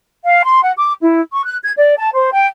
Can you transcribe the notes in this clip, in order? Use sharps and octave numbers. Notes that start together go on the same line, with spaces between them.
F5
C6
F#5
D6
E4
C#6
F#6
G#6
D5
A5
C5
G5